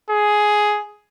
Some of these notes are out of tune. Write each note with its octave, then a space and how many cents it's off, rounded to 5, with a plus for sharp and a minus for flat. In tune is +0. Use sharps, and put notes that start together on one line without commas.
G#4 +10